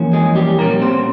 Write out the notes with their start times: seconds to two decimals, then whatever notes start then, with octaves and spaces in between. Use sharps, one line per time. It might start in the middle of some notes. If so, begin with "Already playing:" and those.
Already playing: F2 E3 A#3 C#4
0.13 G#3 G#4
0.36 G3 G4
0.59 A#2 G3 A#3 C#4 A#4
0.82 C4 C5